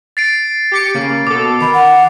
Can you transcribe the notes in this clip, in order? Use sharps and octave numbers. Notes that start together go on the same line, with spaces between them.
A6 C7 D7
G4 D6 C#7
C#3 A#3
B2 A4 D6
D#3 B5
F#5